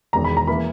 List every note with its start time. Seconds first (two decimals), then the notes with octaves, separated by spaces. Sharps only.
0.13 E1 E2 D#3 A#5
0.24 B5
0.37 A#5
0.47 E3 A#3 B5